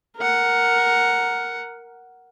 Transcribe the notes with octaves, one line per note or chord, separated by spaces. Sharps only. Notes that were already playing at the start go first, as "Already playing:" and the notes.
A#4 F#5